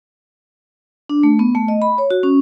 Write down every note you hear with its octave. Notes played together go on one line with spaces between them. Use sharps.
D4
A3
B3
A3
D#5
B5
C#5
F#4
C#4